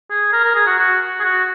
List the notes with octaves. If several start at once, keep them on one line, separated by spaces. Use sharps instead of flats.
G#4
A#4
A#4
G#4
F#4
F#4
G#4
F#4